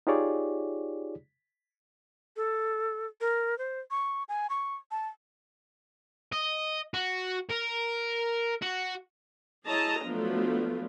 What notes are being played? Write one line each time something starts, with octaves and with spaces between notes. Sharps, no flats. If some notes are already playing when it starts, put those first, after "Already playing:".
D#4 F4 G4 G#4 C#5 D5
A4
A#4
C5
C#6
G#5
C#6
A5
D#5
F#4
A#4
F#4
E4 G#4 C#5 D#5 A5 A#5
F3 F#3 A3 B3 D4 F4